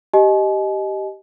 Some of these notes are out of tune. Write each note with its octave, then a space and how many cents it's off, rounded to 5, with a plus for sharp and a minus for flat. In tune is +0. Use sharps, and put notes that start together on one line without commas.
G4 -10 D#5 +0 G#5 +40